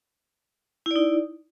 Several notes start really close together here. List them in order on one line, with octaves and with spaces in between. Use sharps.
E4 D5 D#4